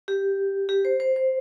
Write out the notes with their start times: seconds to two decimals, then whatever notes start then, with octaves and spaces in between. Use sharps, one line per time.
0.08 G4
0.69 G4
0.85 C5
1.00 C5
1.16 C5